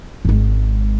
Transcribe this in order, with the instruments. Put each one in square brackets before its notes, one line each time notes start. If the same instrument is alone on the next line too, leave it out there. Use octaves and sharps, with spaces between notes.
[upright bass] G#1 G#3